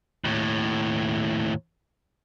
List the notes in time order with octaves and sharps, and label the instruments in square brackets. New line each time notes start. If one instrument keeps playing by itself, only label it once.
[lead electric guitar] D#2 A2